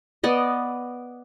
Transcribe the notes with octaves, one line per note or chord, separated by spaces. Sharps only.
B3 D5 D#5